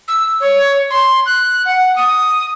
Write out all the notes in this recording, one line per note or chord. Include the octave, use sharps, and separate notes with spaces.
E6
C#5
C6
F#6
F#5
D#6